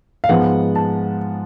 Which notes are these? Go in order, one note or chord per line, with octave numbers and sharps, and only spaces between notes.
F5
G#2 F3 G#3 B3 F#5
A5